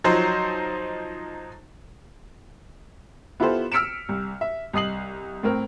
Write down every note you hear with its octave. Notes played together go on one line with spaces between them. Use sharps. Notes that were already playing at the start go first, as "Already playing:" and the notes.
F3 F#3 D#4 C5
B3 E4 F4 G4 A4 C5
E6 F6 B6 C#7 D7 E7
C2
E5
C2 D#5 D#6 C7 F#7
A2 C4 A#4